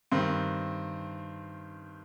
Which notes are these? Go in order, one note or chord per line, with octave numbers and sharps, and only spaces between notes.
G2 D#3 C4